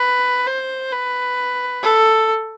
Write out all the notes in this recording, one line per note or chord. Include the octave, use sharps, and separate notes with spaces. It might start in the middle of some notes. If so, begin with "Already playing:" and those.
Already playing: B4
C5
B4
A4